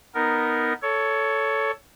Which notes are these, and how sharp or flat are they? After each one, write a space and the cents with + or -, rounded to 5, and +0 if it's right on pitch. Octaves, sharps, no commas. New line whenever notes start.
B3 +0 D#4 +0 A#4 +0
A4 +0 C#5 +15